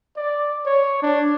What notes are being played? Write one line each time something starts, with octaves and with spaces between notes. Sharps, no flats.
D5
C#5
D4